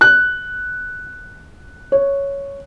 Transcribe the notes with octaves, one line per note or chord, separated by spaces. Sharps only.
F#6
C#5